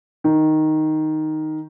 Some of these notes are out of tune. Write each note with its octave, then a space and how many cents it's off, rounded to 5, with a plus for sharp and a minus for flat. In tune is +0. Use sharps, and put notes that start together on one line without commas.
D#3 +0